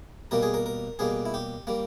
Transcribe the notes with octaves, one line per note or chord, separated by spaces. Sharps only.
B2 G3 A#3 A#4
G#4
A#4
A#4
B2 G3 A#3 G#4
E4
G4
G3 A#3